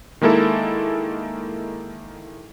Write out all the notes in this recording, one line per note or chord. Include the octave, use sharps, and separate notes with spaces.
D#3 G#3 A#3 E4 A4